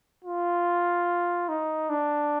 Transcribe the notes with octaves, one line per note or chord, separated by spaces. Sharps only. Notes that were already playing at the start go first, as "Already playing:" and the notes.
F4
D#4
D4